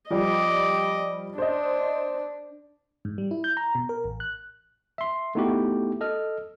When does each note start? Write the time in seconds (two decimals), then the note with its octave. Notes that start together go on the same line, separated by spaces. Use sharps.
0.10 F3 G3 G4 D#5 D6
1.38 D4 C5 D#5
3.05 G#2
3.18 G3
3.31 E4
3.44 G6
3.57 A#5
3.75 B2
3.89 A#4
4.04 A1
4.20 F#6
4.98 E5 C6
5.35 A3 B3 D#4 E4 F#4 G4
6.01 A4 D#5 F6